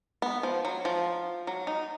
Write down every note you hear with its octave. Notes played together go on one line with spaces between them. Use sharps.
B3
F3
F#3
F3
F#3
D#4